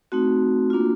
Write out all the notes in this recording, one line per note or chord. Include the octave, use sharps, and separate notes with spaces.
A3 C4 D#4 F#4
A#3 D4 F4